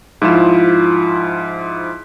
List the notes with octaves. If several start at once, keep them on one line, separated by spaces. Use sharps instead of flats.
G#2 F3 E4 F4 E7